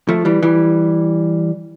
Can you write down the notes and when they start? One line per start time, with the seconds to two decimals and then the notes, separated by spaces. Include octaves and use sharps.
0.09 F3 A3
0.25 E3 G3
0.43 E3 G3